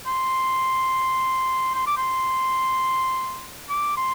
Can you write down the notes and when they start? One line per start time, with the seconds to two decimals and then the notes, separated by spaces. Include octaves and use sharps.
0.07 C6
1.74 C6
1.86 D6
1.97 C6
3.69 D6
3.97 C6